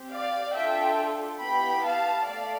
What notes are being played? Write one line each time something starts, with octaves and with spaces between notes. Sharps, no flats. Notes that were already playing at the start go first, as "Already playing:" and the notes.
Already playing: C4 G4
D5 F5
D4 F4 A4 E5 G5
B3 E4 G4 G5 B5
F5 A5
A3 D5 F5